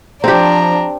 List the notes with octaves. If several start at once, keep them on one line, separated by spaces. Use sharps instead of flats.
F3 C4 D4 G4 A#5